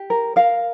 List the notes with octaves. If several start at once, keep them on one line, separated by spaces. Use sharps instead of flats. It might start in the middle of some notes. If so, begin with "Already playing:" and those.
Already playing: G4
A#4
A#4 F5